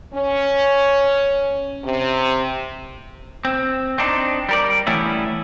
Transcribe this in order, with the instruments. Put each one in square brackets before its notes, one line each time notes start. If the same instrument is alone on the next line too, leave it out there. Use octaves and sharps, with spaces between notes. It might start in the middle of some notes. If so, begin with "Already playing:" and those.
[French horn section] C#4
C3
[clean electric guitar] C4
C4 D4 D#4
G3 A#4 D5
E3 G3 A3 B3 C#4 E4